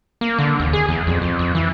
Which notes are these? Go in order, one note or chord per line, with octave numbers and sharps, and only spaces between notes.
A#3
D3
D#2
G#4
E2
F2
F2
F2
E3